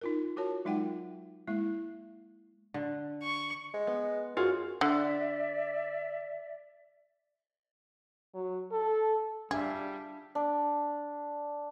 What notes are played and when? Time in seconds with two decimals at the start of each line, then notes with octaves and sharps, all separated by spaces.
0.01 D#4 F4 A#4
0.37 F4 F#4 A#4 C#5 A5
0.65 F#3 G#3 D#4 F4 F#5 G5
1.48 G#3 A#3 E4
2.74 D3
3.23 C#6
3.74 G#3
3.87 B3
4.37 F#2 F4 F#4 G#4
4.81 D3 D5 E5
8.35 F#3
8.72 A4
9.51 G3 D4 G#4 E5 F5
10.35 D4